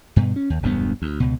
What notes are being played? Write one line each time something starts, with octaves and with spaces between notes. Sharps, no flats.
G2 B2
C#4
D#2
E1 D2 G2 B3
D2
C#2 B2